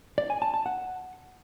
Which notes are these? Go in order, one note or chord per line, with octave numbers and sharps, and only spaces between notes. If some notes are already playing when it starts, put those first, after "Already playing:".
D5
G#5
A5
A5
F#5